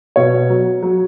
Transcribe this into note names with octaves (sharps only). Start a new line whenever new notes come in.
B2 C#5
F#3
F#3